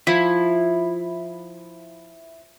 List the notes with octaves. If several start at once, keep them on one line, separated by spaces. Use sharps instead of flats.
F3 E4